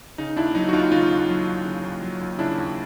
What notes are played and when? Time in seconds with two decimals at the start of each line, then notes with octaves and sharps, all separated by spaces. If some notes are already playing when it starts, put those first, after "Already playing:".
0.18 C#3 D#4
0.36 D#2 D4 E4
0.55 F#3 D#4
0.69 F#4
0.73 D#2 D#4 F4
0.92 C#3 D#4 F4
1.11 D#2
1.29 F#3
1.48 D#2
1.65 C#3
1.83 D#2
2.02 F#3
2.21 D#2
2.39 C#3 D4 E4
2.58 D#2